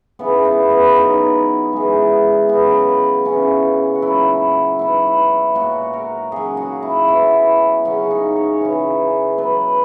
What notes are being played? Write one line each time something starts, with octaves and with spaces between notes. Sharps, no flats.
C#3 E3 B3
B3
B3
B2 F#3 D#4
C#3 E3 G#3
C#3 F#3 B3
C#3 E3 C#4
F#4
A#2 F#3 E4
B2 F#3 E4
A#2 F#3 F#4
A#4
C#3 F#3 G#4
F#4
E4
B2 F#3 E4
C#3 F#3 C#4
D#4
C#5
C#3 E3
B2 F#3 B4